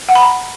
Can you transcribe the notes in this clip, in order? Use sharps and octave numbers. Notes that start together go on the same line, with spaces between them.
F#5
B5
A#5